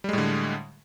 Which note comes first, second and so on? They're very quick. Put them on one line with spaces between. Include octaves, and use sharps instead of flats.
G3 G#3 A2 D3